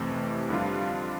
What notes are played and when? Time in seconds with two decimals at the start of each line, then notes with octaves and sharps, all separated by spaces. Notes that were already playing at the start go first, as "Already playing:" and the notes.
Already playing: F2 C3 E3 A3 C4
0.49 F2 D3 G3 D4 F4